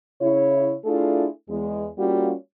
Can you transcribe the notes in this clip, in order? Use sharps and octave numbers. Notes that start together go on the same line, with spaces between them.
C#3 E4 C#5
A3 D4 E4 F4 G#4 A4
E2 G#3
G3 A#3 C#4 F4 F#4